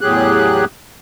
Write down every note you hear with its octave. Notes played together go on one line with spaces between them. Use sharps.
E2 A2 F#3 G4 G#4 F#6